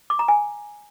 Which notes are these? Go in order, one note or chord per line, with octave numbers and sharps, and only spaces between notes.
D6
A#5
G#5